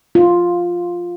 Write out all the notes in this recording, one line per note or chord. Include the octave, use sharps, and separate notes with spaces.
F4